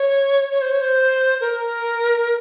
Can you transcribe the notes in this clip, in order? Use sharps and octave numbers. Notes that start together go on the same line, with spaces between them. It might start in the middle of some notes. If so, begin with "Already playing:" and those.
Already playing: C#5
C#5
C5
C#5
C5
A#4